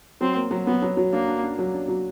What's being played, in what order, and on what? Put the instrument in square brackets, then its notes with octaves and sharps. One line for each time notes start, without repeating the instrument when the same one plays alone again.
[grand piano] F#3 [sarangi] C4
[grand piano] A#3
F#3
[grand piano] F#3 [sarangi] B3
[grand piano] F#3
F#3
[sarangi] A#3 [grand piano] D4
[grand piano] D4
D4
F#3
D4
F#3